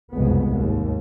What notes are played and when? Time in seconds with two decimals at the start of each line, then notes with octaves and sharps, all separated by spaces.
0.15 F#1 C2 F2 G#3 B3
0.50 G#1 D#2